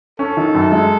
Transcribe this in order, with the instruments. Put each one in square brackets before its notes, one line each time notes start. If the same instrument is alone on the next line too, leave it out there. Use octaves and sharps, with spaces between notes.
[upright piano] C#4 [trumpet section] A4
[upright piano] D#3
F#2
G#3